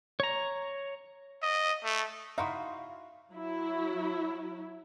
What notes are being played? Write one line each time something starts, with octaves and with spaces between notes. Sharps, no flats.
C#5 A#5
D#5
A3
D#4 E4 F#4 F5 C6
F#3 E4